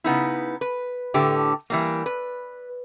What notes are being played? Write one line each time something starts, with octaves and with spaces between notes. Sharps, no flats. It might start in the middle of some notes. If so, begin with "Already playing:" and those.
C#3 B3 D#4 E4
B4
A2 D3 G4
E3 G3 A#3
B4